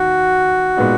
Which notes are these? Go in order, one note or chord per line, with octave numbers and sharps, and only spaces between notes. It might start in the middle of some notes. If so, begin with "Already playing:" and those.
Already playing: D#2 F#4
A#2 G#3 B3 D#4